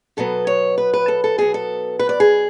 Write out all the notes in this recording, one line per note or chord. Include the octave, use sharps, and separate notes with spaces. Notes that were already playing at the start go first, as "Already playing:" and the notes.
B2 F#3 B3 A4
C#5
B4
B4
A4
A4
B2 F#3 B3 G#4
A4
B4
D5
G#4